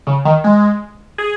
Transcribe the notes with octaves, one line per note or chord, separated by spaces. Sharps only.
C#3
D#3
G#3
G#4